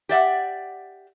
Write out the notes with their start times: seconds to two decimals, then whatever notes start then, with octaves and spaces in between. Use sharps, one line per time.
0.09 G4 D5 E5 F#5